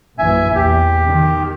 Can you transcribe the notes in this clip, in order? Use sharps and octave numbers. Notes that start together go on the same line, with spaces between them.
A#1 F#2 E3 E5 G#5
E2 G4
D#3